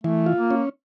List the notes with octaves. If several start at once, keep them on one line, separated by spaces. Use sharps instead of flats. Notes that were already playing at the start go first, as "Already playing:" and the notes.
E3 A3
F4
A#3
C#4